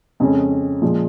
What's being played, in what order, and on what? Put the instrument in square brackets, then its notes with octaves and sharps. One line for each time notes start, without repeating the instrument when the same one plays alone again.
[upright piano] F2 C#3 G#3 C#4
A#2 F3 G#3